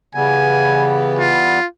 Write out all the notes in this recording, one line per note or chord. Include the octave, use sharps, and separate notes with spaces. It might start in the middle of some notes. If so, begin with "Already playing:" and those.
C#3 E3 G3 B3 G#5
F4